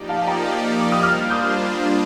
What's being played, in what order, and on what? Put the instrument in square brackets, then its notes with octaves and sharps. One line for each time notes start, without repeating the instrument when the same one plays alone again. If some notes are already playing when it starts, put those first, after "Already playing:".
Already playing: [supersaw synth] F3 A#3 D#4 G4 D5
[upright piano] F5 A5
A5
G5 A#5
D6
D#6
[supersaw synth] G3 A#3 D4 F4 C5 [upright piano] D6 F6
[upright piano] D#6 G6